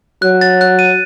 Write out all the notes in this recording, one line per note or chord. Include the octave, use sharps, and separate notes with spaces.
F#3 F#6
A6
F#6
D#7